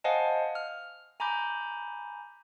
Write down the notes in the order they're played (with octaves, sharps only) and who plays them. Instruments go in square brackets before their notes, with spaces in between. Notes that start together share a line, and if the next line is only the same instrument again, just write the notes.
[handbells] C5 D#5 F5 F#5 G#5 A5
F6
G#5 A#5 B5 D6 G6